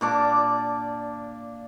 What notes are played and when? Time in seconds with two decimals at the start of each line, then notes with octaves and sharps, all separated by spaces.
0.01 A#2 D4 D6